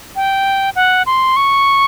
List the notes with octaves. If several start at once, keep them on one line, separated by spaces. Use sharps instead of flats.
G5
F#5
C6
C#6